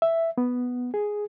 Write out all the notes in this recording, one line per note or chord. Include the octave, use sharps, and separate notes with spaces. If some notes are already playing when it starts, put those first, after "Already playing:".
E5
B3
G#4